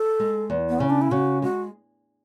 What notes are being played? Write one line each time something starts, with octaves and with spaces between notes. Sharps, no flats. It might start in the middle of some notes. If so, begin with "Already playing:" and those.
Already playing: A4
G#3
E2
B3
C#3 C#4
D4
E4
C#3 F#4
G#3 F#4